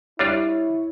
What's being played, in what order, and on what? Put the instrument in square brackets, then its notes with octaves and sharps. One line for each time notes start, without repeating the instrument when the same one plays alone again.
[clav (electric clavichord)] G3 D4 F4 [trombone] E4 [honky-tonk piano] C#5